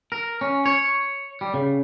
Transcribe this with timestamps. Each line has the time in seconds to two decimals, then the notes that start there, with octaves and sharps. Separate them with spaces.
0.12 A#4
0.41 C#4
0.66 C#5
1.41 G3
1.54 C#3